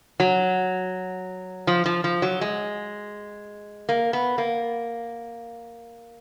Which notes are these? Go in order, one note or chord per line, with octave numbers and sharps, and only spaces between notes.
F#3
F3
F3
F3
F#3
G#3
A#3
B3
A#3